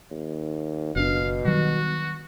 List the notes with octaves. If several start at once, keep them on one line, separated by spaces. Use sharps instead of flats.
D#2
F#1 B2 D4 F5
D#3 F#3 G3 F#4